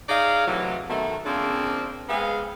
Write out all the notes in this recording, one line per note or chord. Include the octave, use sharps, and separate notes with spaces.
D#4 G#4 D5 F5
A2 C3 E3 F#3
B2 D#3 A3
C#3 F3 A#3 C4 D4
G#3 B3 C4 G#4 F5